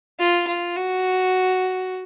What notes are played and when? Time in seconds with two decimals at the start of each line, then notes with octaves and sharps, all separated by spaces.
0.20 F4
0.48 F4
0.76 F#4